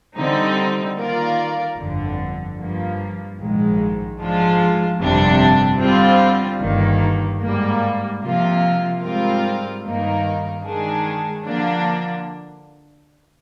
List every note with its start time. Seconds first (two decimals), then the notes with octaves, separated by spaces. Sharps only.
0.17 D3 G3 C4 D#4
0.97 D#3 A#3 F4 A#4 D5
1.78 G1 F2 D3
2.58 G2 F3 A#3
3.39 A#1 G#2 D#3 G#3
4.19 G#2 F3 G#3 D4 F4
5.00 G1 F2 C3 G3 D4
5.80 D3 G3 C4 F4
6.61 G1 G2 D#3 A#3
7.42 G#2 G3 A#3
8.22 C3 F3 A#3 F4
9.02 G#2 G3 C4 F4 A#4
9.83 G2 D#3 A#3 D#4 A#4
10.63 D#3 G#3 D4 G#4
11.44 D3 F3 A#3 D4